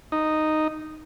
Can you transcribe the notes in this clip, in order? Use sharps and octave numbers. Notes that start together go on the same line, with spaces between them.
D#4